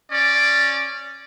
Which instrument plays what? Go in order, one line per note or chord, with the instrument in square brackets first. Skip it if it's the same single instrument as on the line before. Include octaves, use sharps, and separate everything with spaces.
[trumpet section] C#4 D5